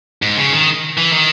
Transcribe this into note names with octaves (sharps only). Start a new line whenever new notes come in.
G#2
C#3
D#3
E3
D#3